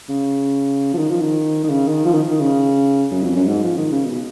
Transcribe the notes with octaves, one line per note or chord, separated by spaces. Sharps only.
C#3
F3
D#3
F3
D#3
D#3
C#3
D#3
F3
D#3
D#3
C#3
F#2
F2
F#2
G#2
F3
D#3
C#3
B2